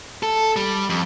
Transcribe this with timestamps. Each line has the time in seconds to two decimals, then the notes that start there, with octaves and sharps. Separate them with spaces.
0.23 A4
0.56 G3
0.90 F2